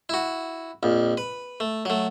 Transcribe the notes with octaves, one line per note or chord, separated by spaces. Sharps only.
E4 F#4
A#1 F2
B4
A3
F#3 A3